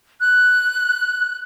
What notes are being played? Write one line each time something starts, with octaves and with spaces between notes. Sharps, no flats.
F#6